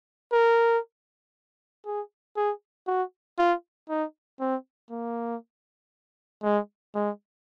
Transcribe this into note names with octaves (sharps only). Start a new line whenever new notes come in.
A#4
G#4
G#4
F#4
F4
D#4
C4
A#3
G#3
G#3